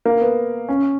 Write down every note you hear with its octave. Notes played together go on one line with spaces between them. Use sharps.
A#3
B3
C#4